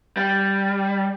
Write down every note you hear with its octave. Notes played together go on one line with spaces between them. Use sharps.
G3